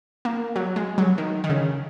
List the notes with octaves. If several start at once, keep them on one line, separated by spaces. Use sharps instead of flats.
A#3
F#3
G#3
F#3
D#3
D#3
C#3